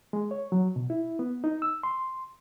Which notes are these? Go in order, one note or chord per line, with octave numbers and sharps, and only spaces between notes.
G#3
C#5
F#3
B2
E4
B3
D#4
E6
C6